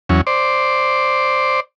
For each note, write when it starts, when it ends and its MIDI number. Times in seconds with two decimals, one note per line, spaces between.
0.09 0.21 40
0.09 0.21 54
0.09 0.21 61
0.27 1.60 72
0.27 1.60 74